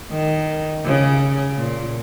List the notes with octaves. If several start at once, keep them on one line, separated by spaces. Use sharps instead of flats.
D#3
C#3
A#2